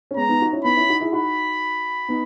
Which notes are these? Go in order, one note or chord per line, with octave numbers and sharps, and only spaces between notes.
C#4
G#3 B3 A#5
B3 D#4
D#4 F#4
C#4 E4
B3 D#4 B5
C#4 E4
D#4 F#4
E4 G#4
D#4 F#4 B5
B3 D#4